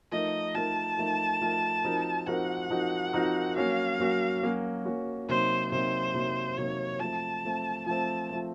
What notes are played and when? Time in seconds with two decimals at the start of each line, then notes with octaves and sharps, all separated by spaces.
0.12 F3 A3 D#4 A#4 D#5
0.54 F3 A3 D#4 A#4 A5
0.97 F3 A3 D#4 A#4
1.41 F3 A3 D#4 A#4
1.84 F3 C4 D#4 F#4 A#4
2.27 F3 C4 D#4 F#4 A#4 F#5
2.70 F3 C4 D#4 F#4 A#4
3.13 F3 C4 D#4 F#4 A#4
3.56 F#3 A#3 C#4 F#4 F5
3.99 F#3 A#3 C#4 F#4
4.43 F#3 A#3 C#4 F#4
4.85 F#3 A#3 C#4 F#4
5.29 C3 F#3 A#3 D#4 C5
5.72 C3 F#3 A#3 D#4 C5
6.14 C3 F#3 A#3 D#4
6.58 C3 F#3 A#3 D#4 C#5
7.00 F3 A3 C4 A5
7.44 F3 A3 C4
7.86 F3 A3 C4 A5
8.31 F3 A3 C4